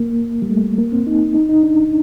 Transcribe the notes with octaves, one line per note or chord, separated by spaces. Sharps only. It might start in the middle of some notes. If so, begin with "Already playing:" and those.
Already playing: A#3
G3
A3
A#3
C4
D#4
D#4
D#4
D4